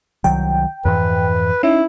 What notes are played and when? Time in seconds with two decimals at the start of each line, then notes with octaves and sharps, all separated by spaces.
0.24 C2 D#3 F#3 G5
0.85 F2 G#2 E3 B4
1.63 C#4 D#4 E4